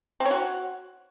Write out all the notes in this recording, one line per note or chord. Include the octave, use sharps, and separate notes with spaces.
C4
C#5
F#4